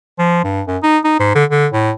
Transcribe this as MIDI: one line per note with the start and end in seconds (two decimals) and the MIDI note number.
0.19 0.43 53
0.44 0.61 43
0.67 0.77 42
0.83 0.98 63
1.04 1.16 63
1.20 1.30 44
1.35 1.44 50
1.50 1.67 50
1.72 1.91 45